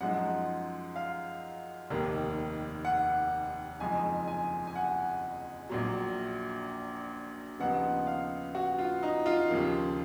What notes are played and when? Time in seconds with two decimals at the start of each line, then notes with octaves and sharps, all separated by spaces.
0.01 F#2 F3 G#3 D#4 F#5
0.96 F5
1.90 F1 D#2 D#3 A#3
2.85 F#5
3.80 F#1 F2 F3 G#3 D#4 G#5
4.27 G#5
4.67 G#5
4.75 F#5
5.69 A#1 A#2 F#3
7.59 D#2 C#3 F3 B3 D#4 F#5
8.07 F5
8.55 F#4
8.78 F4
9.03 D#4
9.26 F4
9.50 D#2 C#3 F3 A#3